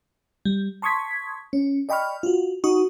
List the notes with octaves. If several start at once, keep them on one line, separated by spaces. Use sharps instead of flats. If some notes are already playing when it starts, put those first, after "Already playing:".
G3
A5 C6 C#6 D#6 G#6 B6
C#4
D5 D#5 G5 B5 C#6 F6
F4 F#4
D#4 F#4 C#6 D#6